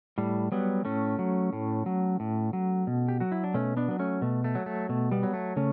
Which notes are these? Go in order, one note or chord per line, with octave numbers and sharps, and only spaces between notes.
A2 G3
F#3 G3 B3
A2 A3 C#4
F#3
A2
F#3
A2
F#3
B2
G4
F#3 F#4
E4
D4
B2 A3 C#4
B3 D4
F#3 B3
A3 C#4
B2 A3
A3
F#3
A3
B2 A3
G3 B3
F#3
A3
C#3 A3 C#4